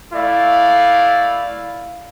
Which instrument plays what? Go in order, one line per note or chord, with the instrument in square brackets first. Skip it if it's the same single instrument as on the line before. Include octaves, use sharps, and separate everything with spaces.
[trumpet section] A3 E4 D5 F5